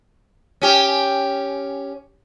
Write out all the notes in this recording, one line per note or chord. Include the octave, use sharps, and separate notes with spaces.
C#4 G4